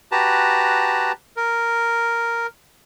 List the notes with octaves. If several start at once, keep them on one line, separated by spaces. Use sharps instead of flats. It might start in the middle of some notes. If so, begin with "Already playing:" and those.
F#4 G4 B4 A5 A#5
A#4